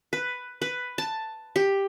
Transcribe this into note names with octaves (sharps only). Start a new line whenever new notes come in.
B4
B4
A5
G4